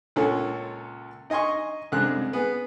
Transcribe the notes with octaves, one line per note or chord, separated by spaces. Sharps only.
C#2 A#2 C#4 A4
D#4 D#5 G#5 C6 C#6
C2 F#2 D3 G#3 F#6
B3 G#4